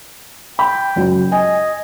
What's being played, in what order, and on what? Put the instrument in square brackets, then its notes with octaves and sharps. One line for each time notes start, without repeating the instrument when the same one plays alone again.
[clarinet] G5 [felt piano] B5
[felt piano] F#1 F#3
[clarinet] D#5 [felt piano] G#5